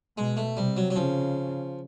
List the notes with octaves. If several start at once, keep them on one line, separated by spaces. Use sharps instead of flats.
B2 G#3
A3
C3 G3
F#3
F#3
C#3 F3